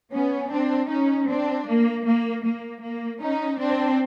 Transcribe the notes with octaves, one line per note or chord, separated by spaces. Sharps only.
B3 C#4
C4 D4
C#4 D#4
C4 D4
A#3
A#3
A#3
A#3
C#4 D#4
C4 D4